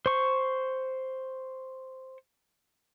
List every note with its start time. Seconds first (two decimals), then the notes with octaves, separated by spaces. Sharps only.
0.06 C5 C#6